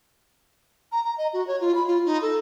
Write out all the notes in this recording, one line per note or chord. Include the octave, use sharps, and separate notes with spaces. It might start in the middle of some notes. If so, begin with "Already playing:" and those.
A#5
A#5
D#5
F#4
C#5
F4
B5
F4
D#4
A4